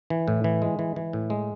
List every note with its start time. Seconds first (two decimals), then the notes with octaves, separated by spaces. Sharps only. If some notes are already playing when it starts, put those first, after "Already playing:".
0.10 E3
0.28 A2
0.44 E3
0.62 G#3
0.79 E3
0.96 E3
1.13 A2
1.30 G#3